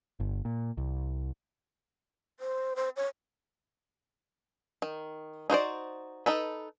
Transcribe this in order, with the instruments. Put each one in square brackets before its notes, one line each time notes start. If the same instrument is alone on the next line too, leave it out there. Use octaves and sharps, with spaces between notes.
[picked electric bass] G1
A#2
C2
[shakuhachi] C5
C5
C#5
[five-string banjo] D#3
D#4 F#4 C5 D5
D#4 A4 B4